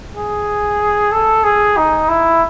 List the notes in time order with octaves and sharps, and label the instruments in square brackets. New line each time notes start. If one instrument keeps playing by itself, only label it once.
[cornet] G#4
A4
G#4
D#4
E4